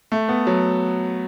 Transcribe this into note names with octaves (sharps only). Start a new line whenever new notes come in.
A3
B3
F#3